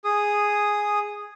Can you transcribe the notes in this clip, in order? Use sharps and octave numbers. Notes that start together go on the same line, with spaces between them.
G#4 D#6